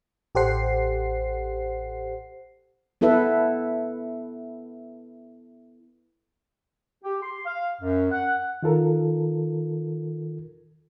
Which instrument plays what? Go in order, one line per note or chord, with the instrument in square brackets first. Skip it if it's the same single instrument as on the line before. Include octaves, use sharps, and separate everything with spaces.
[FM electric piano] A1 G4 A4 C5 F#5 C7
[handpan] B3 E4 A4 B4 E5
[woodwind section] G4
C6
F5
F#2
F#5
[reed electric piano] D#3 F4 A4 A#4